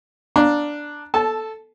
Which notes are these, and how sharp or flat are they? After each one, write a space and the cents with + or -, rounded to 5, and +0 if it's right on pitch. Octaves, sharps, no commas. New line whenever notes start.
D4 +0 F5 +15 A#5 +5
A4 +0 A5 -20